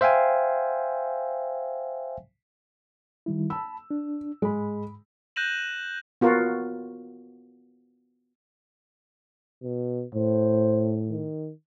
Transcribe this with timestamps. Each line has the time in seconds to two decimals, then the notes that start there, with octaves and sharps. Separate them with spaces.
0.01 C5 E5 F5 G5 G#5
3.26 D#3 G3 E4
3.50 A5 B5 E6
3.91 D4
4.42 G#2 G#3 B5
5.36 F#6 G6 A#6 D#7 E7 F#7
6.21 B3 F4 F#4 A#4
9.63 B2
10.15 A2 C5
11.09 D#3